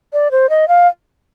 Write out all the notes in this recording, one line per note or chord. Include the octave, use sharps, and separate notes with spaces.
D5
C5
D#5
F5